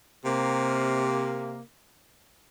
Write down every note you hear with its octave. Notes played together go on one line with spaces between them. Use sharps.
C3 A#3